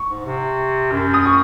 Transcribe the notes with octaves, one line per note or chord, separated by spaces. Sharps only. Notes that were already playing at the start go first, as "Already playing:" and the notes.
Already playing: C#6
G#2
C3
F#2
D#6
C#6